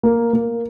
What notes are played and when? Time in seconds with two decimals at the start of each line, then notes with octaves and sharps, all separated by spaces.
0.03 A#3
0.33 A#3